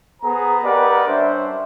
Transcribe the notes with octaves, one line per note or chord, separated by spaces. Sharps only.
B3 G#4 C5 A#5
G4 A#4 B4 D5 D#5 F#5
G3 C#4 D4 C5 E5